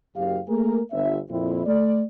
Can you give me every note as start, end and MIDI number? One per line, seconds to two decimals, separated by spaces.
0.16 0.40 30
0.16 0.40 42
0.16 0.40 67
0.16 0.40 77
0.47 0.80 57
0.47 0.80 58
0.47 0.80 68
0.47 0.80 70
0.91 1.17 31
0.91 1.17 76
1.30 1.66 41
1.30 1.66 46
1.30 1.66 60
1.30 1.66 64
1.66 2.02 57
1.66 2.02 74